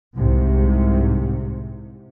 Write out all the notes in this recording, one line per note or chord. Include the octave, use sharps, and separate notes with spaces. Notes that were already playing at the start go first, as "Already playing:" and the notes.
C2 G#2 C3